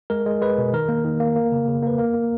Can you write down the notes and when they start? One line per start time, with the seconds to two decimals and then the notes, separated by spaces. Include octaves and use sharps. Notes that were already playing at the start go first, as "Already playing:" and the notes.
0.10 G#3 A#4
0.26 G#3
0.41 G#3 B4
0.58 B2
0.73 D#3 A#4
0.89 A#3
1.04 D#3
1.20 A#3
1.36 A#3
1.52 C#3
1.68 C#3
1.83 A#3 B4
1.98 A#3 A#4
2.14 A#3